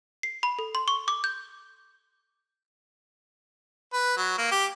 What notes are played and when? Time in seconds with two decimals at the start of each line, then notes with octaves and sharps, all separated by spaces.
0.23 C7
0.43 B5
0.59 A4
0.75 C6
0.88 C#6
1.08 D6
1.24 G6
3.93 B4
4.17 F#3
4.38 A#3
4.51 G4